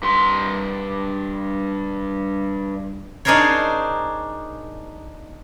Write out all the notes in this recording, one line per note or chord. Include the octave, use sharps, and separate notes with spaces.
G2 C6
D4 D#4 G#4 A#4 C5 C#5